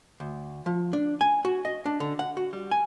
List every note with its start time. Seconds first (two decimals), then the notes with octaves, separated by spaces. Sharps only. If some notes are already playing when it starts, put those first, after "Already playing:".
0.20 D2
0.66 F3
0.93 D4
1.21 G#5
1.45 F#4
1.65 D#5
1.86 D4
2.00 D3
2.19 F#5
2.37 F#4
2.53 G3
2.71 G#5